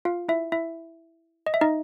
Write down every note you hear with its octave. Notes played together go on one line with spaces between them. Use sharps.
F4 F5
E4 E5
E4 E5
D#5
E5
D#4 D#5